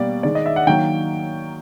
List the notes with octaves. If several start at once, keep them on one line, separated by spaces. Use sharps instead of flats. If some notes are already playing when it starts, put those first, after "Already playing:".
Already playing: B2 G3 A#3 D5
D#3 G#3 D5
D#5
E5
F#5
D#3 F#3 A#3 G5